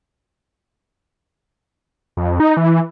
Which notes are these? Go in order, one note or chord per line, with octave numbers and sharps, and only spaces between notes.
F2
D#4
E3